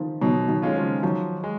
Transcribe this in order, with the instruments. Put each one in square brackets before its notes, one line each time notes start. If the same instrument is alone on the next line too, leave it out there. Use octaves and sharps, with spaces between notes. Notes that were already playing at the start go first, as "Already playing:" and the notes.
Already playing: [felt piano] D#3 F3
[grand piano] B2 [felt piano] D#3 F#3
[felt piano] D#3 F#3
[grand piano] G#3 C#4 F4
[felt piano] C#3 F3
[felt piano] D#3 F#3 [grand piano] F3
[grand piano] G#3